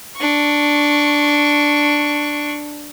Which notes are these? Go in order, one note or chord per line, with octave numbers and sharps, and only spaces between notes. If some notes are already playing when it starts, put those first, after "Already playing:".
D4 C#6